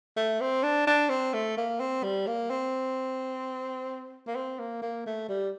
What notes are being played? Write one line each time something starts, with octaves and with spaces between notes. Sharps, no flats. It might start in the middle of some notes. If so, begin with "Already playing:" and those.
A3
C4
D4
D4
C4
A3
A#3
C4
G3
A#3
C4
A#3
C4
A#3
A#3
A3
G3